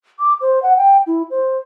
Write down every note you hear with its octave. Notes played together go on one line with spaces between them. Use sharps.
D6
C5
F#5
G5
E4
C5